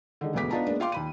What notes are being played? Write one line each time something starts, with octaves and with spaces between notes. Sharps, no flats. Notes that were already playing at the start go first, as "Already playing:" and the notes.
D3 D#3 G#3
E1 D2 G#2 B3 D6 B6
B3 D4 D#4 F4 A5 A#5
G#3 A#3 B3 D4
F4 F5 G5 C6 D6
D#2 B5 D#7